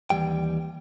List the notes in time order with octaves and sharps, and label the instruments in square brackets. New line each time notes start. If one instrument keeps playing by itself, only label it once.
[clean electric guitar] D#2 G#2 E3 G3 G5